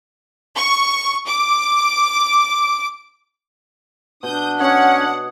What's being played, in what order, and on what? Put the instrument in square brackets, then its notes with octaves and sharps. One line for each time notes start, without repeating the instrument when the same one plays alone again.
[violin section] C#6
D6
[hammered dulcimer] B2 [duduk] D4 [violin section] D#6 G6
[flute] C#4 [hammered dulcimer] C#5 D#5 [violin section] F#5